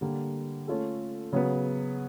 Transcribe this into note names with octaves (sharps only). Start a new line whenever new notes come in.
D3 G3 A#3
A3 C#4 F4 A4
C#3 F#3 B3